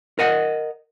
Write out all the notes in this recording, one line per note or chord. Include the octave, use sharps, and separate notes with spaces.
A#4 D#5 F#5